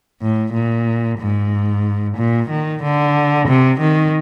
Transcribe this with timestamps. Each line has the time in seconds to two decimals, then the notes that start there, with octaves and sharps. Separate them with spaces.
0.21 A2
0.53 A#2
1.19 G#2
2.17 A#2
2.50 D#3
2.83 D3
3.48 C3
3.80 D#3